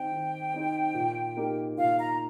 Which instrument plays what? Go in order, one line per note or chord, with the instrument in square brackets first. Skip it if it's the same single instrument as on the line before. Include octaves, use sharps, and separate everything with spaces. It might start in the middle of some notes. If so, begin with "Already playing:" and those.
Already playing: [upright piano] D#3 C4 D#4 C5 [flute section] G5
[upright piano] D#3
C4 D#4 C5
A#2
A#3 D#4 G4 A#4
[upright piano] A#2 [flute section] F5
[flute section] A#5